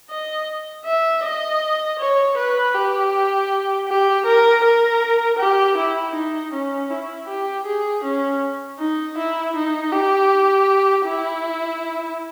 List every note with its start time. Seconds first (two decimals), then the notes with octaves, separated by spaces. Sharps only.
0.10 D#5
0.85 E5
1.24 D#5
1.99 C#5
2.37 B4
2.74 G4
3.88 G4
4.26 A#4
4.64 A#4
5.39 G4
5.77 E4
6.15 D#4
6.53 C#4
6.90 E4
7.28 G4
7.66 G#4
8.04 C#4
8.79 D#4
9.17 E4
9.56 D#4
9.92 G4
11.06 E4